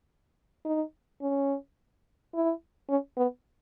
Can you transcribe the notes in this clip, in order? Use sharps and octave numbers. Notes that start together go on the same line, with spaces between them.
D#4
C#4
E4
C#4
B3